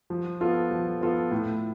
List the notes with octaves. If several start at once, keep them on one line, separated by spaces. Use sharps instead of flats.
F3
B3 F4 A4
F3
B3 F4 A4
A2